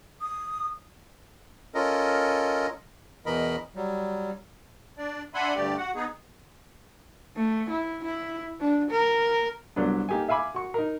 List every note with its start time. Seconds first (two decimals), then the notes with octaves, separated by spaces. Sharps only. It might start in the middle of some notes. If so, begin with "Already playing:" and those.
0.21 D#6
1.75 C#4 F4 A4 A#4 D#5
3.26 E2 B2 E3 A#4 D#5 B5
3.76 F#3 G3
4.98 D4 D5
5.34 D4 E5 F#5 G#5 B5 C6
5.55 D2 G2 A3 G4 D5
5.77 F#4 F#5
5.95 B3 D#4 G#4
7.36 A3
7.70 E4
8.04 E4
8.60 D4
8.91 A#4
9.76 C2 F#3 B3 D4
10.09 A#3 D#4 G4 A4 G#5
10.29 E5 F5 G#5 B5 D6
10.54 F#4 C#6
10.74 D#4 A#4